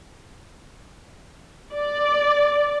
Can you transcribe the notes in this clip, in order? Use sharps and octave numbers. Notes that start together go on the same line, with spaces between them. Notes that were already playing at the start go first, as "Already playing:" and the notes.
D5